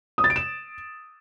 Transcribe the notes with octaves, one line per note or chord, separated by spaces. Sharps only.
D#6
A6
D7
E7